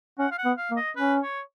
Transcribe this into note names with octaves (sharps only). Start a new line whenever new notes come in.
C#4 F#5
F5
F#5
B3
F5
A#3
D#5
C#4 B4
C#5